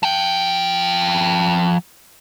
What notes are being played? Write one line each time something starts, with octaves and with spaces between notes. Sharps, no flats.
F3 G5